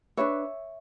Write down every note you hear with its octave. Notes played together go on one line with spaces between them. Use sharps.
D4 F#4 B4 C#5 E5